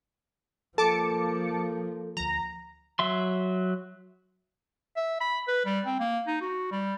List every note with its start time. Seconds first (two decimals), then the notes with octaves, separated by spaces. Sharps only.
0.78 F3 A#3 A4 A5 D6 C#7
2.17 D2 F3 A#5
2.99 F#3 E5 C6
4.96 E5
5.21 B5
5.48 B4
5.65 G3
5.86 C4
6.00 A#3
6.27 D#4
6.41 F#4
6.71 G3